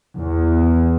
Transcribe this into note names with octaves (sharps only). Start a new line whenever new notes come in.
E2